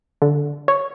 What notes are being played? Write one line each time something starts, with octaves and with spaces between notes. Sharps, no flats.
D3
C#5